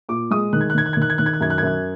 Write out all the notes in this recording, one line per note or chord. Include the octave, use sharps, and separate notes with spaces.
A#2 D6
G#3 D#6
D#3 F#6
G#6
F#6
D#3 G#6
F#6
G#6
D#3 F#6
G#6
D#3 F#6
G#6
F#6
F#2 G#6
F#6
G#6
F#2 F#6